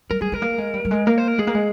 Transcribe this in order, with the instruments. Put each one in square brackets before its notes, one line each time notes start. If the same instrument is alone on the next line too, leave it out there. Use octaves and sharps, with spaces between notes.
[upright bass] G3 [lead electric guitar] A#4
[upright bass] G3 [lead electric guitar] G#4
[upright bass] G#3 [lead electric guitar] A#4
[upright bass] A#3
G#3
G3
G3
G#3
[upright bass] A#3 [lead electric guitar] A#4
[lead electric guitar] C5
A#4
[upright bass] G#3 [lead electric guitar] G#4
[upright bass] A#3
G#3